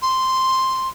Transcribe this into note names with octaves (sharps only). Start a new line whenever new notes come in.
C6